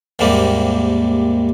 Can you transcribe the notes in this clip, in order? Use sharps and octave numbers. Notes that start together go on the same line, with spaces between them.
D#2 G#2 C3 G3 A#3